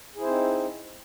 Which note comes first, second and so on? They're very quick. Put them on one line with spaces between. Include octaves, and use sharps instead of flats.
G#4 E4 C5 C4 D#4